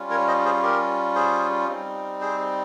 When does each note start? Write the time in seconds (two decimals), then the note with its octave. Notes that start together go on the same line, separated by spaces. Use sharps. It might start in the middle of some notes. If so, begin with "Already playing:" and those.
Already playing: G3 C#4 F4
0.10 A#4 C#5
0.28 C5 D#5
0.45 G#4 C5
0.63 G4 A#4
1.15 G#4 C5
1.68 G3 C4 D#4
2.21 G#4 C5